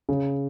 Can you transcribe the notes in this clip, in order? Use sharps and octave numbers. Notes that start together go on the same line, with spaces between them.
C#3